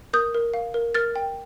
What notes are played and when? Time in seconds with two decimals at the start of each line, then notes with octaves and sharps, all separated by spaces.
0.13 A#4 D#6 G6
0.34 A#4
0.54 F5
0.74 A#4
0.95 A#4 F6 A6
1.16 G5